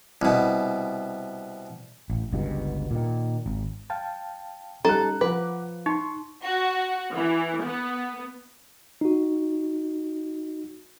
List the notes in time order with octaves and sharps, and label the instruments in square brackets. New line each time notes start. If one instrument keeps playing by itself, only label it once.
[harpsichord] C2 B2
[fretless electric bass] A1
G1 C#2 G2 B2
A#2 D#3
G#1
[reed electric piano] F5 G5 A5
[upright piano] G3 F#6 [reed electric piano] C#4 D#4 [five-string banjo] A4 [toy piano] A#5
[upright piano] F3 [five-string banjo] B4 [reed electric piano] F#5 D6
[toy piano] D#4 [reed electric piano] C6 C#6
[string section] F#4
E3
B3
[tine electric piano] D#4 F#4